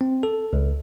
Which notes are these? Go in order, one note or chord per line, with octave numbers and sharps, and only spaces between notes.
C4
A4
C#2